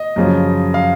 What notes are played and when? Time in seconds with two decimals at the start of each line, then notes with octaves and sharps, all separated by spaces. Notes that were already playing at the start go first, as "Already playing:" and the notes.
Already playing: D#5
0.16 F#2 C#3 F3
0.74 F5